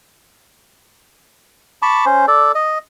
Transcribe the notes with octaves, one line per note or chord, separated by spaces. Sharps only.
A5 B5 C#6 D6
C#4 C5
A4 D5
D#5